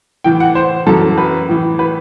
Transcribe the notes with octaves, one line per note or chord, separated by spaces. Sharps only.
A2 E3 G5
F#5
C5
F#2 E3 A4
B4
A2 E3
B4